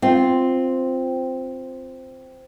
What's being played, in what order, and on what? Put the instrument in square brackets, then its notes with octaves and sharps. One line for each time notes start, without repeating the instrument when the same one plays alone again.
[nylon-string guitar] C4 F4